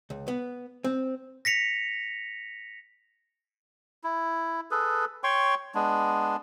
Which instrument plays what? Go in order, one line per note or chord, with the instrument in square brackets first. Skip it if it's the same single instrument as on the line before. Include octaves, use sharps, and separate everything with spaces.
[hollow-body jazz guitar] C#2
B3
C4
[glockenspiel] A#6 B6 C#7 F7
[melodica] E4
G#4 A4 B4
C#5 G5 C6 C#6
G#3 B3 D4